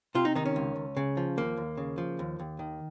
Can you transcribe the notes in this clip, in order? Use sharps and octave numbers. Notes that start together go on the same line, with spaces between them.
C3 F4
D#4
D#3 D#4
C#4
C#2
C#2
C#3
F3
D#2 A#3
D#2
C#3
F3
D#2
D#2
D#3